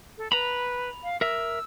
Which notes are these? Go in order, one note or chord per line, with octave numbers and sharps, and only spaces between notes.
A4
B4 A#5 B5
F5
A#4 E5 E6